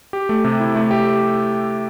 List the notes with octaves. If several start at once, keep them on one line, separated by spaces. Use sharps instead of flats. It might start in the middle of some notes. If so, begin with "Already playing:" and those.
G4
A3
C3
E4
A3
G4